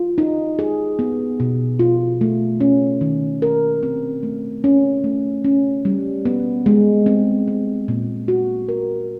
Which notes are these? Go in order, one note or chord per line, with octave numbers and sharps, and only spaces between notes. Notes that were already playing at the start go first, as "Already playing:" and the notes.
Already playing: F4
D#4
G#4
B3
B2
F4
A3
C#4
D#3
A#4
C4
A3
C#4
A3
C#4
G3
B3
G#3
C4
C4
A#2
F#4
A#4